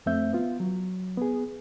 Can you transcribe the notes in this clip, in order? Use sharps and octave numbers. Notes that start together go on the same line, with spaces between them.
F2 A3 C4 E5 G6
B3 F4
F#3
B3 G#4